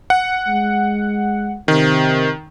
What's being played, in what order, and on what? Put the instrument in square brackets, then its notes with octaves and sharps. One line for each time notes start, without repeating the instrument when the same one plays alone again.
[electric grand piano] F#5
[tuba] G#3
[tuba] C3 [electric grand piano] D#3